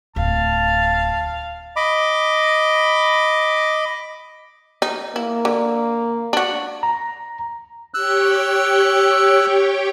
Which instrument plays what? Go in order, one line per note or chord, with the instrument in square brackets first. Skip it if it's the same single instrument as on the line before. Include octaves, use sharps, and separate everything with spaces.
[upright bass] D1 [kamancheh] F5 [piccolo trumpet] A5
[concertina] D#5 B5 D6
[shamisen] D#4
[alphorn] A#3 [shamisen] E4
[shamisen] D3
D4 F#4
[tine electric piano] A#5
[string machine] G4 C#5 G5 [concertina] E6 F#6